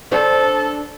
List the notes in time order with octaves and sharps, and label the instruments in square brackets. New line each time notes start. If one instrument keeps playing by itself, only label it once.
[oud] D4 C5 C#5 [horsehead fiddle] A4